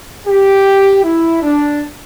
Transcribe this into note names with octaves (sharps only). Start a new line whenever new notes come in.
G4
E4
D4